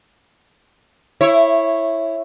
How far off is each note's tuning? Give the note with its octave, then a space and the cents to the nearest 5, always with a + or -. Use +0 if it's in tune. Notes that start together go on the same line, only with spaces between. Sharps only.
E4 +5 C#5 -15